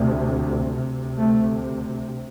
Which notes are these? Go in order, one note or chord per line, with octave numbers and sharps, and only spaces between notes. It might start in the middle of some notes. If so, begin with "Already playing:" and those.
Already playing: D2 C3
D2 C3
A3